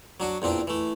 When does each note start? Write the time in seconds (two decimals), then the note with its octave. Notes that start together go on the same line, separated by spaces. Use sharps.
0.20 F#3 D4 F#4
0.42 E2 A#2 C4 D4
0.67 E3 A3